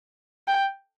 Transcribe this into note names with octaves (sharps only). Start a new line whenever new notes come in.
G5